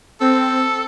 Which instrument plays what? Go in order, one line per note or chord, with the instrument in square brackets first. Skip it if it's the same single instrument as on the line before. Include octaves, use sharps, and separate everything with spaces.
[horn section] C4 [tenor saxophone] A4